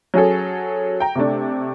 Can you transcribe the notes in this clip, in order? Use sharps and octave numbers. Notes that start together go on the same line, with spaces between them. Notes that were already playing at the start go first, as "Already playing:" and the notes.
F#3 C#4 G#4 A4
G5 A#5
C3 A3 D4